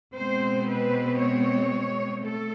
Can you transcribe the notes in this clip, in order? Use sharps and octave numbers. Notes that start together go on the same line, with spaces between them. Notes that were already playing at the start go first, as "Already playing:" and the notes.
B2 G#3 C4 C5
B4
C#5
A3 A4